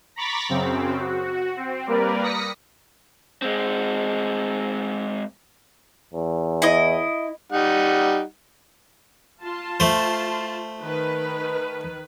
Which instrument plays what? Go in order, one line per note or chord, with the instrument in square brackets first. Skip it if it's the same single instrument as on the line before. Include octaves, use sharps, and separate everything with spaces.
[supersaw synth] A#5 B5 C#6 D6 A6 B6
F#2 C#3 C4
F#4
C4
G3 A#3 A#4 B4 D5
D#6 A#6 B6 C#7
[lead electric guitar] G#3 C4
[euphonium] E2
[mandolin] E4 D#5
[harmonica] G3 D#4 F#5
[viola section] F4 A5 C6
[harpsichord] A3 C5
[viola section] D#3 B4